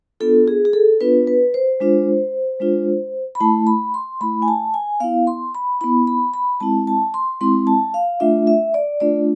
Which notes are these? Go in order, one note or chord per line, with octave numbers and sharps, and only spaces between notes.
B3 D4 F4 A4
G#4
G#4
A4
B3 D4 F4 B4
B4
C5
G#3 D4 F4
G#3 D4 F4
B5
A3 E4 A5
B5
C6
A3 E4 B5
G#5
A5
G#5
B3 E4 F5
C6
B5
B3 E4 B5
B5
B5
G#3 C4 E4 A5
A5
C6
G#3 C4 E4 C6
A5
F5
A3 D4 F4 E5
E5
D5
A3 D4 F4 D5